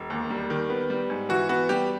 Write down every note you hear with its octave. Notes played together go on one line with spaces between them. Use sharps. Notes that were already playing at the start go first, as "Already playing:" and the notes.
Already playing: E1
D#2
G3
D#3
B3
G3
G#2
E3 F#4
B3 F#4
G3 G4